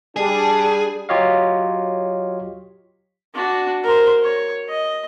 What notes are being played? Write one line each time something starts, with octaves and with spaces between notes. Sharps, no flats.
G3 D4 G#4
F#3 F4 G4 C#5 D#5 F5
D4 F#4
A#4 C5
C#5
D#5